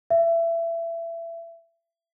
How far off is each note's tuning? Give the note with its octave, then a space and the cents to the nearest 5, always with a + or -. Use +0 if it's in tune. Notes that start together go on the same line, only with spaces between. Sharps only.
E5 +25